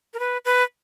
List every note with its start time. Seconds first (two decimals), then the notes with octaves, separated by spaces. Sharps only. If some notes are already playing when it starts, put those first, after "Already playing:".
0.14 A#4
0.19 B4
0.45 B4